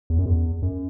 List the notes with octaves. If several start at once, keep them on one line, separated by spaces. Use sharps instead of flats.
E2
F#2
E2
F#2